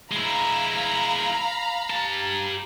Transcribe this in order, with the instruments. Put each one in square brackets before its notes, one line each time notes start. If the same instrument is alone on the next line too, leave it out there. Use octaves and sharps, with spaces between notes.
[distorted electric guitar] G#3 E4 [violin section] F5 A#5 B5
[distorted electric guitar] G4 A5